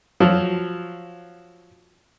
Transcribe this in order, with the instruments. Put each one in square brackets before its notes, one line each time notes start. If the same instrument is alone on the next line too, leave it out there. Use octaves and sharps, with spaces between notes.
[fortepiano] F3 F#3